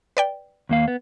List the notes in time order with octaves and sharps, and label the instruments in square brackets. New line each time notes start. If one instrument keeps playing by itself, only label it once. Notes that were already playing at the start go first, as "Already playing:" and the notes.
[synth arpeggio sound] B4 D5 G5
[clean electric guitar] D#2 A#3 F5
B3